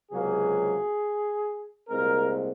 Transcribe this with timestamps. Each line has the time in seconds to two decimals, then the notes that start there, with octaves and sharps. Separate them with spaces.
0.12 C#2 C3 F#3 A#3 G#4
1.88 C2 A#2 G#3 C4 A#4